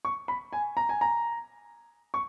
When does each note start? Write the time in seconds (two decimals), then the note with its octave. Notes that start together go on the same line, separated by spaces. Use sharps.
0.05 C#6
0.28 B5
0.53 G#5
0.77 A#5
0.89 G#5
1.01 A#5
2.14 C#6